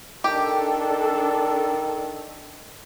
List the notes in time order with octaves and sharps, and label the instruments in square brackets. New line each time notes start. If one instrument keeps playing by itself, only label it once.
[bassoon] D#3 [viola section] D4 A4 [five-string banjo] G4